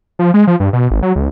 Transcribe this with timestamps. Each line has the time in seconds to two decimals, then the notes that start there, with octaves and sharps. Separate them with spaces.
0.19 F3
0.34 G#3
0.47 F3
0.60 G2
0.73 B2
0.91 G#1
1.02 F#3
1.16 C#2